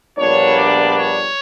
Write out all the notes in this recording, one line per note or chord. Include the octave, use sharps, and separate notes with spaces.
A#1 A#2 G3 B3 D4 C#5
D5
C#5